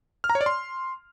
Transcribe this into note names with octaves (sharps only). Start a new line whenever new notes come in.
F6
A#5
C#5
D5
C6